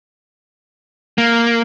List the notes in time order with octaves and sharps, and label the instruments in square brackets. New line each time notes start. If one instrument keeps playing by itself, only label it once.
[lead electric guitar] A#3